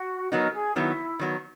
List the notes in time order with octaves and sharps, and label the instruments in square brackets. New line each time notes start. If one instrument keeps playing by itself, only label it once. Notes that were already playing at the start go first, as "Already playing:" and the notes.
Already playing: [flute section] F#4
[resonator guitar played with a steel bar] F#3 B3 D#4 [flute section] A#4
[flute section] G#4
[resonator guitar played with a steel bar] D#3 F#3 B3 [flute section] E4
[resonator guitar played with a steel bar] D#3 F#3 B3